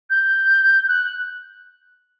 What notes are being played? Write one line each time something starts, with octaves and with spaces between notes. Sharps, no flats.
G6
F#6